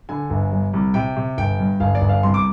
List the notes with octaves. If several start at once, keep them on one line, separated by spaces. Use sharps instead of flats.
D3 G#5
G1
G3
C2
C3 G5
C3
G1 G5
G2
G1 F5
D5
G1
F5
C2 C6
D6